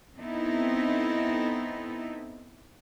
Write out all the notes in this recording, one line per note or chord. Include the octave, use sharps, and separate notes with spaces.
B3 C4 D#4 E4 A4